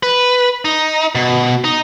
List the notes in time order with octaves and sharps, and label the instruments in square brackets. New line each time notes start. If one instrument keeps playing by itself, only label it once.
[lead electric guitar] B4
D#4
B2
D#4